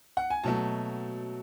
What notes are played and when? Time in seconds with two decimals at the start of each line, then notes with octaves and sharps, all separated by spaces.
0.17 F#5
0.30 G#5
0.44 B2 F#3 A3 A5